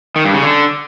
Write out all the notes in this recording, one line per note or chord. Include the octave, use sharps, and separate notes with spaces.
D#3
G2
C#3
D3